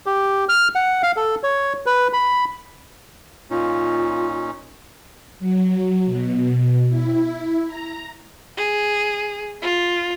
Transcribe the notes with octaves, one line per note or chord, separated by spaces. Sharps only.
G4
F6
F#5
F5
A4
C#5
B4
B5
A#2 C#4 D#4 F4
F#3
B2
E4
A#5
G#4
F4